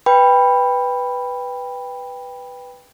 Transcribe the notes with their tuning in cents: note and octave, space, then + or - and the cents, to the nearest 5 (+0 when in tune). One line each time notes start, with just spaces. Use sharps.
B4 +0 G5 +15 B5 +0